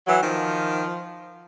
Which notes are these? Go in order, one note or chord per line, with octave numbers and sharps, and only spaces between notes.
E3 F#3
D#3 F3